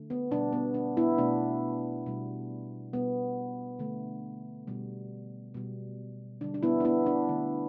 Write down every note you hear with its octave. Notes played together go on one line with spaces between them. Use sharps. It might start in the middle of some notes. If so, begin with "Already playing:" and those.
Already playing: D3 A3
B3
B2 G3 D4
B3
D4
B3 E4
B2 A3 D4
B2 G3
B2 G3 B3
D3 A3
B2 G3
B2 G3
D3 G3 D4
D4
B3 E4
D4
B3 E4
D4
D3 A3